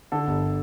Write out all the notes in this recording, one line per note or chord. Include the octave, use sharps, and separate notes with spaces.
D3 A4
G1